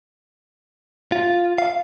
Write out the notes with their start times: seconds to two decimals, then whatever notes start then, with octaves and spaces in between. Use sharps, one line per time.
1.12 F4
1.58 F5